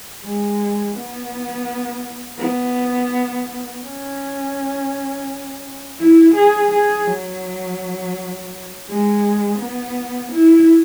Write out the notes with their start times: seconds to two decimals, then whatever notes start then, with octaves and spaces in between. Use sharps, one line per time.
0.23 G#3
0.95 B3
2.39 B3
3.84 C#4
5.99 E4
6.35 G#4
6.72 G#4
7.08 F#3
8.88 G#3
9.59 B3
10.32 E4